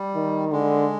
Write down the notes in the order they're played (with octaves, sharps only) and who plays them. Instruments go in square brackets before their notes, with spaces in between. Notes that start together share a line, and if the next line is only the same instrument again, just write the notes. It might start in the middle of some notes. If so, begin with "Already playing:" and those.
Already playing: [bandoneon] G3
[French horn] D#3
[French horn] D3 [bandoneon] G#3